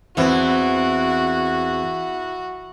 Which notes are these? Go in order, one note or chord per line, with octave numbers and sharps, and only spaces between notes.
E2 E3 C4 F#4